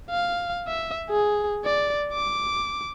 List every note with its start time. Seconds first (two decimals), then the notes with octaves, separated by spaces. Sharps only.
0.10 F5
0.67 E5
1.10 G#4
1.65 D5
2.13 D6